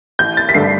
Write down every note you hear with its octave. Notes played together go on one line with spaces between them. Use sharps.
A1 G6
A6
B6
G2 D3 A3 D4 C7